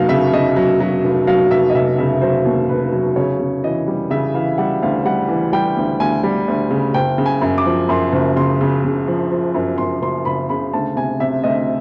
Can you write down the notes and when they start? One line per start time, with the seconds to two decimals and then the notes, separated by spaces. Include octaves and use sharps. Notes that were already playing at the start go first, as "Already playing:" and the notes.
Already playing: F1 D#2 F#3 F5
0.09 C#3 E5
0.33 C#3 D#5
0.56 F#3
0.80 F#3
1.04 F1
1.27 F#3 F5
1.51 F1 E5
1.70 D#5
1.75 F1 E5
1.98 C#3 E5
2.21 F#3 C5
2.45 D#2
2.69 F1 B4
2.92 F#3
3.16 C#3 C#5
3.40 C#3
3.64 E3 D#5
3.87 G3
4.10 C#3 E5
4.34 E3 F5
4.58 G3 F#5
4.82 D2 F5
5.05 G3 F#5
5.29 E3
5.52 G3 G5
5.77 D2
6.00 D2 G#5
6.23 G3
6.48 D2
6.71 C#3
6.94 F#1 G5
7.18 C#3
7.26 G#5
7.42 F#2
7.58 D6
7.66 F3
7.89 F#2 C6
8.12 F#1
8.36 C#3 C6
8.61 C#3
8.84 C#3
9.08 F3
9.32 F3
9.54 F#2
9.78 F#2 C6
10.02 F#1 C6
10.25 F#1 B5
10.49 C#3 B5
10.73 D2 A5
10.96 C3 G#5
11.20 C3 E5
11.44 D2 D#5